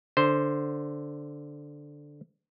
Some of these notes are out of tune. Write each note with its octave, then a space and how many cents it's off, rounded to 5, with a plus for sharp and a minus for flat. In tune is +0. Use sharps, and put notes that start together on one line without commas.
D3 +0 C5 +0